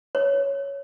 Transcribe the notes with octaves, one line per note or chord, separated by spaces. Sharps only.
C#5